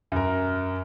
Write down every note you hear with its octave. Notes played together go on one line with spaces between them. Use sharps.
F#2 A#4